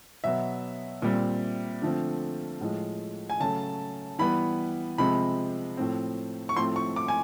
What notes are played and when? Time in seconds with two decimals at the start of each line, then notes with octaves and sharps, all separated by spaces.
0.24 B2 F#3 B3 E5
1.02 A#2 G3 C4
1.82 D3 F3 A3 C4
2.61 A2 F3 G#3
3.30 G#5
3.40 C#3 F#3 A3 A5
4.19 E3 G3 B3 B5
4.98 C3 F3 G#3 C4 B5
5.77 A2 F3 A3 C4
6.49 C#6
6.57 A2 F3 A3 C4 C6
6.76 C#6
6.96 D6
7.08 G#5